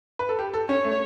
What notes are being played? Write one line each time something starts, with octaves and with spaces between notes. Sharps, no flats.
B4
A4
G4
A4
C#4 C#5
A3